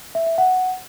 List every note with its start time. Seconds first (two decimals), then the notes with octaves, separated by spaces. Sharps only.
0.15 E5
0.26 E5
0.38 F#5